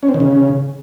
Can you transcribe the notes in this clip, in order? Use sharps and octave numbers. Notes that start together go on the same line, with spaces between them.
C#4
C4
D#3
C#3